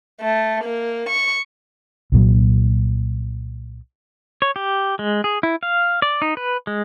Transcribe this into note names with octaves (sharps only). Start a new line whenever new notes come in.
A3
A#3
C#6
C2 A#2 F#3
C#5
G4
G#3
G#4
E4
F5
D5
D#4
B4
G#3